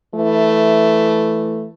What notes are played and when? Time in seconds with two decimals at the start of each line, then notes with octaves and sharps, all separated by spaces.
0.13 E3 A3